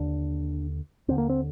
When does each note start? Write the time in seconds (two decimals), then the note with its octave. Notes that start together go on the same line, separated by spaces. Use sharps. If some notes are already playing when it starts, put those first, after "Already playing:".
Already playing: D#2 D3 D4
1.08 D#2 D3 C4
1.18 A#3
1.29 C4